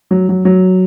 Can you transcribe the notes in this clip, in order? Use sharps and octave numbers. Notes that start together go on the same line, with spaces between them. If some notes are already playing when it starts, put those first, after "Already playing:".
F#3
F#3
F#3